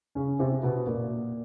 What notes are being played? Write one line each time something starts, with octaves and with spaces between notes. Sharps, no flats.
C#3 C#4
C3 C4
B2 B3
A#2 A#3